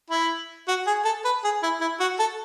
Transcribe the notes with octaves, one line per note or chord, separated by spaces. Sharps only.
E4
F#4
G#4
A4
B4
G#4
E4
E4
F#4
A4